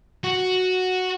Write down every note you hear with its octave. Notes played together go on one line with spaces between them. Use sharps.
F#4